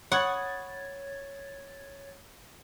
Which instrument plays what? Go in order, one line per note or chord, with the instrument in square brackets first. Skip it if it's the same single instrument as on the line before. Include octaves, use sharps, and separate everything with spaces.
[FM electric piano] C#5 G#6 A6 [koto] F#5 [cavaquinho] B5 C#6 D#6